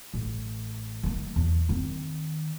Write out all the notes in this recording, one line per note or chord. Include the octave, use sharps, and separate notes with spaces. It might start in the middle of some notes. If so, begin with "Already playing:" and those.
A1
D#3 A#3
E2
D#3 C4